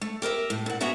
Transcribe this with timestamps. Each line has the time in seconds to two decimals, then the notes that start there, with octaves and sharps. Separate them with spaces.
0.01 A3
0.22 G4 A#4 B4 E5
0.50 A2
0.66 A#2 F#5
0.80 A#3 B3 F#4 G#4 E5 A#5